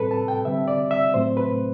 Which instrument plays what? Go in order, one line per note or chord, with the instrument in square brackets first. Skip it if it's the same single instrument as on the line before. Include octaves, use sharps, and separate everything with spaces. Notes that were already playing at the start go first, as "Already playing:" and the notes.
Already playing: [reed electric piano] A2 G3 C4 A4 B4
A5
G5
D3 G3 C4 E5
D5
E5
A2 F#3 A3 C4 C5
B4